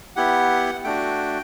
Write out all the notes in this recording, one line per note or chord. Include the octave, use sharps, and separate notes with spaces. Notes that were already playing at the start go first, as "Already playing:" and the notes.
B3 E4 G4 F#5
A3 D4 F#4 G5